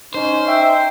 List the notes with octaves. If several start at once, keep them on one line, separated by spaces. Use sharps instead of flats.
C#4 D#4 C5
E5 G5